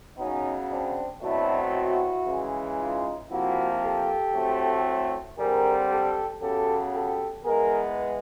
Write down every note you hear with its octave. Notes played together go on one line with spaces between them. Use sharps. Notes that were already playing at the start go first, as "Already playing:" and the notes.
C#3 F#3 B3 C#4 D#4
C4 D4
B2 F#3 A3 C4 D4 E4
E4 F#4
C#3 E3 G#3
D#4 F4
C3 F3 A#3 E4 F#4
G4 A4
A2 F#3 A3 C4
D3 G3 C4 G#4 A#4
G4 A4
C#3 F#3 B3 G4 A4
G4 A4
E3 G#3 B3 G#4 A#4